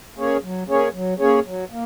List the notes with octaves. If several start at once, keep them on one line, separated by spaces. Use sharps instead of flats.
A#3 C#4 G#4 C#5
F#3
A#3 C#4 G#4 C#5
F#3
A#3 C#4 G#4 C#5
F#3
A#3